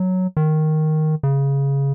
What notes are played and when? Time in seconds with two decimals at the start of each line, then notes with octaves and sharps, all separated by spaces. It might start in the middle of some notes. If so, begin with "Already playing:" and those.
Already playing: F#3
0.37 D#3
1.23 C#3